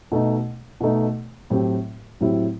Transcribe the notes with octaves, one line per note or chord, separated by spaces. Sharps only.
B2 A3 D#4
B2 A3 D#4
A2 F#3 C4 E4 G4
A2 F#3 C4 E4 G4